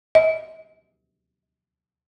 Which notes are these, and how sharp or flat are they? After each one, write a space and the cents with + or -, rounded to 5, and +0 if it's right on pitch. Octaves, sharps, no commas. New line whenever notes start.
D#5 +45